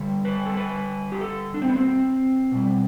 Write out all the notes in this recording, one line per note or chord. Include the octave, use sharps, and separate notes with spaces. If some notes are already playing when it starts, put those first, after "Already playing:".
Already playing: D3 G3
B4
A4
B4
G4
A4
D4
C4
B3
C4
B2 G3